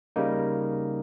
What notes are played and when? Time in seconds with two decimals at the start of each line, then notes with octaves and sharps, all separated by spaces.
0.16 C#3 G3 A#3 D#4